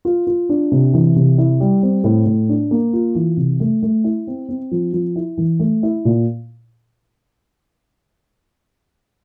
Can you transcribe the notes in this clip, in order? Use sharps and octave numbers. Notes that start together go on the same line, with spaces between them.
F4
F4
D4
C3
E3
C3
E4
G3
C4
A2
A2
D4
A#3
F4
E3
C3
A3
A3
E4
C4
C4
F3
F3
E4
E3
A3
E4
A#2